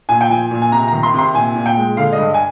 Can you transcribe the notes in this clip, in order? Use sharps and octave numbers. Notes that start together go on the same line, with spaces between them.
A#2 G#5
G5
F3 G#5
A#2
G#5
C3 A#5
D#3 A#5
C6
C3 C6
A#2 G#5
A#2
G5
G#3
D3 F5
D#5
G2
G#5